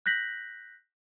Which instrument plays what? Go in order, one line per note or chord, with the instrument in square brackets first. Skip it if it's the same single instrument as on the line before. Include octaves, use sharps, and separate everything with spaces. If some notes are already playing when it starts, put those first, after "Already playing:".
[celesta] F#6 G6 A#6 B6 F#7